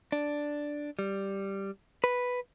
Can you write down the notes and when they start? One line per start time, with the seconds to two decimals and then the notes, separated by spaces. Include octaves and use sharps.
0.12 D4
0.99 G3
2.04 B4